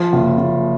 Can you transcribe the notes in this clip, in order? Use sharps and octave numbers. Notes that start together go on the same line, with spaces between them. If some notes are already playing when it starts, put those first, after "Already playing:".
Already playing: F3
F#1
F#1